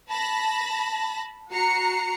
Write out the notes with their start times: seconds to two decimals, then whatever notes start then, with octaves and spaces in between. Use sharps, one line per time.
0.11 A5 B5 A#6
1.51 F#4 A#5 C7 C#7